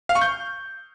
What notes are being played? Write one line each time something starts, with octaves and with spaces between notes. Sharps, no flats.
F5
C#6
G6